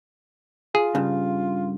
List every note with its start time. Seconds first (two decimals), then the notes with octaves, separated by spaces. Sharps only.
0.75 F4 G#4
0.95 G2 C#3